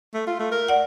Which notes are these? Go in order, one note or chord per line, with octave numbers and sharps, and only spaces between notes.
A3
F4
A3
A#4
D5 F#5